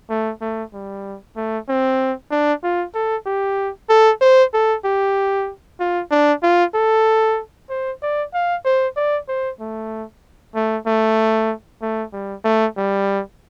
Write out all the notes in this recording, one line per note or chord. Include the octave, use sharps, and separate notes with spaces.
A3
A3
G3
A3
C4
D4
F4
A4
G4
A4
C5
A4
G4
F4
D4
F4
A4
C5
D5
F5
C5
D5
C5
A3
A3
A3
A3
G3
A3
G3